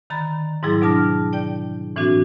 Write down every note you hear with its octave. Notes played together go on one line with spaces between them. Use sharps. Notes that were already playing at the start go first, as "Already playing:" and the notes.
D3 D#3 A#5 B5 A6
G#2 F#3 G3 E4 G#4 A6
B2 F#3 D4 A5 F6 A#6
D5 G5 G6
A2 E3 C4 D4 F#4